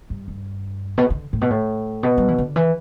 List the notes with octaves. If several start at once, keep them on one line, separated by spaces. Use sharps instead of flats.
G2
G2
B2
D3
A2
B2
A2
B2
G3
E3
D3
E3